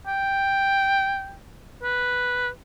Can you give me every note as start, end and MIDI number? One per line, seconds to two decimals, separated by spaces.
0.07 1.35 79
1.83 2.48 71